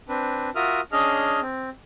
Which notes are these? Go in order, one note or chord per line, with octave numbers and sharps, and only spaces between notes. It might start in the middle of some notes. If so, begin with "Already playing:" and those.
C4 D4 B4
F4 F#4 A#4 E5 D#6 F6
C#4 D4 G#4 D#5 F6
C4